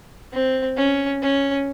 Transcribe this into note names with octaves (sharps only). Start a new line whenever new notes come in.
C4
C#4
C#4